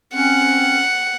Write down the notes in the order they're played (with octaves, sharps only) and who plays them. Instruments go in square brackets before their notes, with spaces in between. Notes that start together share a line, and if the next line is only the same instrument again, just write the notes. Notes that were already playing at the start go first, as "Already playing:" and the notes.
[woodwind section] C4 C#4 [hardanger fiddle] F#5